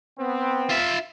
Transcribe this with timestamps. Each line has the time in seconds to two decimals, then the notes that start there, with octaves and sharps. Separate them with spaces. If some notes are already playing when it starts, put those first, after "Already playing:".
0.19 B3 C4
0.69 F4 E5